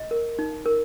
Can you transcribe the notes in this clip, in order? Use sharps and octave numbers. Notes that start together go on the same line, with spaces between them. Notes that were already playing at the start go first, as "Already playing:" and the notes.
Already playing: D#5
A#4
D#4
A#4